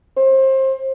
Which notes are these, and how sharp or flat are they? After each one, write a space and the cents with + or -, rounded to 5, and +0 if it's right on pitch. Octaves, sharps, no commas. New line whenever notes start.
C5 +30